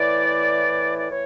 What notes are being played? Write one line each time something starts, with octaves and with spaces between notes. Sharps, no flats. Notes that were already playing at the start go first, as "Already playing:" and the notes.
Already playing: A2 E3 D5
D5
A2 E3 C#5